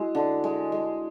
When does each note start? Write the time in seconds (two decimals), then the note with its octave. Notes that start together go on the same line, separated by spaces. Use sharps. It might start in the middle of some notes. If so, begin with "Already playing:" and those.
Already playing: G#3 E4 F#4
0.15 D3
0.44 G#3
0.72 G#3